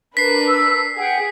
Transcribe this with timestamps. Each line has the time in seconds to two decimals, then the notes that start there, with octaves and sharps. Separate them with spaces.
0.17 D4 A#4 B4 B6 C7
0.46 E6
0.97 G#4 F#5 G5